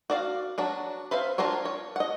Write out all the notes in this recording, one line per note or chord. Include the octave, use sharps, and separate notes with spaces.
F#4 D5 F5
F#3 D4 F#4
B4 C5 E5 F5
D4 F4 A#4 C5 C#5
C#5
D#5 F#5